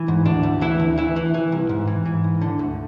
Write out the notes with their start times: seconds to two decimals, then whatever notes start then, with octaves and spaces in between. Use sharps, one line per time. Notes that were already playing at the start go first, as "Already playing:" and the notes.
Already playing: E3
0.08 G#2
0.25 D2 D4
0.43 D2
0.61 E3 E4
0.80 D2
0.98 E3 E4
1.16 E3
1.34 E3
1.52 C2
1.69 G#2
1.87 E3
2.06 E3
2.24 G#2
2.41 D3
2.59 D2